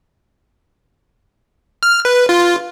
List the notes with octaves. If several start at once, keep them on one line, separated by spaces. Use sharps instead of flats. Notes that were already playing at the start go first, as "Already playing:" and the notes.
F6
B4
F4